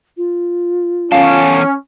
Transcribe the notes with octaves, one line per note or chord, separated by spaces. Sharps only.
F4
E2 C#4 A4 F5